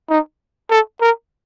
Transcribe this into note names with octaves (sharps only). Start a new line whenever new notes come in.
D#4
A4
A#4